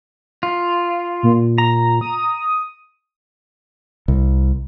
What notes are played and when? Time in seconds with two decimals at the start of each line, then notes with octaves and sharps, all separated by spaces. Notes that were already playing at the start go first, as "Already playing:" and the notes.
0.43 F4
1.23 A#2
1.58 A#5
2.01 D#6
4.08 C2